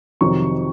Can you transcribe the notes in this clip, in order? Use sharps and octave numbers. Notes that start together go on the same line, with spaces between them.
F2 C3 D#3 F#3 C#6